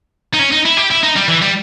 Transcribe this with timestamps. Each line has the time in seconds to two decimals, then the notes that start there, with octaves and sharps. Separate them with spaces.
0.34 D#4
0.39 C#4
0.52 D#4
0.65 E4
0.77 G4
0.91 E4
1.03 D#4
1.16 G3
1.28 E3
1.41 G3